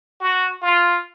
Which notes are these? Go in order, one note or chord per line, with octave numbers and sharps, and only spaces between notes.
F#4
F4